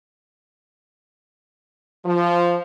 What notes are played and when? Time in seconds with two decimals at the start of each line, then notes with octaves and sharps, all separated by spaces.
2.05 F3